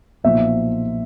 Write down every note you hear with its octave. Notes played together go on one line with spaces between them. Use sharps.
B1 A#2 F3 E5